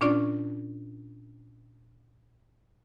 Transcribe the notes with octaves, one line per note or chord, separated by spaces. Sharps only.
A#2 C#4 D4 F4 D5 C#6